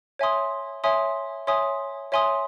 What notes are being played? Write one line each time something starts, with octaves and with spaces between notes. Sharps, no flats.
C#5 E5 G#5 C6 D#6
C#5 E5 G#5 C6 D#6
C#5 E5 G#5 C6 D#6
C#5 E5 G#5 C6 D#6